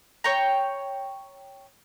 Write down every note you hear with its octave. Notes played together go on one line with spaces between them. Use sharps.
C#5 G5 A#5